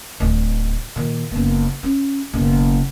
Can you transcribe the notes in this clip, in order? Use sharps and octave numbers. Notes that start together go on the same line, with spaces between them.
D1 D2
A#2 D#3
F#1 B3
C#4
F#1 B2